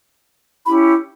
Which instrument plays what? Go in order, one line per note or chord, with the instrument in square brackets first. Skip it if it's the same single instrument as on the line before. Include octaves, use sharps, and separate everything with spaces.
[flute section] C#4 E4 G4 B5